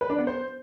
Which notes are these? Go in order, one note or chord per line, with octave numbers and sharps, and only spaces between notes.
B4
D4
B3
C5